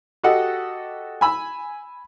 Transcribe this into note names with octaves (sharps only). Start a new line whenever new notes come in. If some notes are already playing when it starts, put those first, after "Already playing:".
F#4 G4 A4 D#5 F#5
G#5 B5 E6